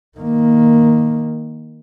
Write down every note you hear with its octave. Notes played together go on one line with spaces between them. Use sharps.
D#3 A#3